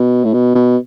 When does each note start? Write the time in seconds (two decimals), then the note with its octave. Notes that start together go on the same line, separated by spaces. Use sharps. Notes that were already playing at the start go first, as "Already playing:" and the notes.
Already playing: B2
0.25 A2
0.34 B2
0.55 B2